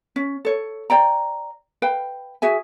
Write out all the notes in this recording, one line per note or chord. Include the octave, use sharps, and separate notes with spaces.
C#4
A4 C#5
C5 D5 G5 A#5
B4 F5 G5
F#4 G#4 E5 G#5